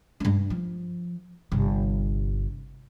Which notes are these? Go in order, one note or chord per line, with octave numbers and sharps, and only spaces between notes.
G2 D4
F3
G1 C3